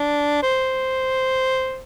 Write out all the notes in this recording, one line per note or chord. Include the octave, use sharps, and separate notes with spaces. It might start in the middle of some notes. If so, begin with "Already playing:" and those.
Already playing: D4
C5